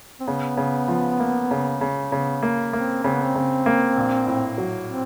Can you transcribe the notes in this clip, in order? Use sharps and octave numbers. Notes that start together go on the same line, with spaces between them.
C4
C#3 B3
C#3
F3
A#3
C#3
C#3
C#3 B3
A#3
A#3 C4
C#3 C4
B3
C4
C#3
A#3
A#1
A2
F#3
C4